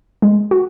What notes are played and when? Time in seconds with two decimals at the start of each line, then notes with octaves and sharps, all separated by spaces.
0.22 G#3
0.51 F#4